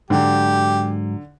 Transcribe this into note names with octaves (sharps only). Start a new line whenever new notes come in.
G#2 D3 F#3 G4